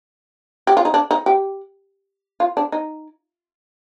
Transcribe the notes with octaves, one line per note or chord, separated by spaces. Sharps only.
G4
F4
D#4
D4
D#4
G4
F4
D4
D#4